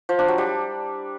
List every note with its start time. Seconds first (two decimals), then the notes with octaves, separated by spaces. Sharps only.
0.09 F3
0.19 D4
0.28 F#3
0.38 G3